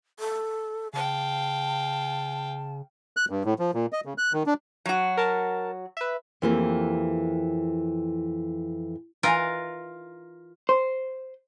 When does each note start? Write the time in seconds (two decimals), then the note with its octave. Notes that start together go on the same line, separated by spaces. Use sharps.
0.20 A4
0.93 C#3 F5 G5 A5
3.17 F#6
3.30 G2
3.45 A2
3.59 F3
3.74 A#2
3.93 D#5
4.05 C#3
4.18 F#6
4.33 D#3
4.46 D4
4.86 F#3 F#4
5.17 A#4 A5
5.97 B4 E5
6.42 F2 E3 A#3 G4
9.23 E3 D#4 F4 A#4 B4
10.69 C5